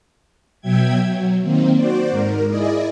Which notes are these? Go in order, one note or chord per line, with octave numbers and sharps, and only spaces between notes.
B2 F#3 E5 G5 G#6
F#3
D#3 A#3 C4
F#4 C5 D5
G#2 A#4
E4 G#4 D5 D#5